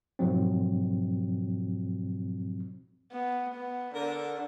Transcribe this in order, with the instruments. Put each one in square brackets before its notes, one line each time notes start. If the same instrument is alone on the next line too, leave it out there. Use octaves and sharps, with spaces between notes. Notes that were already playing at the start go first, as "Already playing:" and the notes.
[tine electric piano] G#2 B2 F3 F#3 C4
[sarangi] B3
B3
[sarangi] D3 [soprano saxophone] A#4